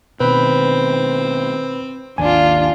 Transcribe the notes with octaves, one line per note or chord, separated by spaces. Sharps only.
B2 D#3 C4 B4 B5
G#1 D#2 D4 F4 G#5